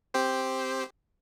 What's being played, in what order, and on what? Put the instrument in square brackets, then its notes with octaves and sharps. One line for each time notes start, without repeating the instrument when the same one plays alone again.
[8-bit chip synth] C4 G4 C5